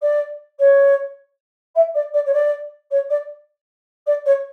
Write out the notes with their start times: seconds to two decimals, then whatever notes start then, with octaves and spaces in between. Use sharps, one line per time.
0.02 D5
0.59 C#5
1.75 E5
1.94 D5
2.13 D5
2.26 C#5
2.33 D5
2.91 C#5
3.10 D5
4.06 D5
4.25 C#5